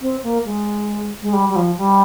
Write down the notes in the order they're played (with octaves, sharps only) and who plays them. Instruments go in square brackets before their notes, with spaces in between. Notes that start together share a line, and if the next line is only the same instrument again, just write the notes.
[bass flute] C4
A#3
G#3
G#3
G3
G3
F3
G3